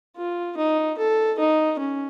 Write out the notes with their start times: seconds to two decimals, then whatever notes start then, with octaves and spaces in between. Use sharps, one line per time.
0.17 F4
0.57 D#4
0.98 A4
1.39 D#4
1.79 C#4